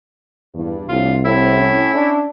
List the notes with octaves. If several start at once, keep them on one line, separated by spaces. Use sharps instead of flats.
E2 G2
C2 A2 D3 F4
A2 C4 E4
C#4
D4